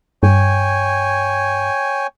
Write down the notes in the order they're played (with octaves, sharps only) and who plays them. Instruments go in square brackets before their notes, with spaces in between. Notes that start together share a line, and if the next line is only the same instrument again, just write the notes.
[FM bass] G2 [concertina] C#5 G5 G#5